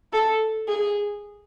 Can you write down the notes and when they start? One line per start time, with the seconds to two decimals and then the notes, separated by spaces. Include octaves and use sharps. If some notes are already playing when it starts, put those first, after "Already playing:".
0.13 A4
0.68 G#4